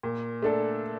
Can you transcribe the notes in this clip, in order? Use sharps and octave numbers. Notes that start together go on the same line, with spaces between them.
A#2
A3 D4 A4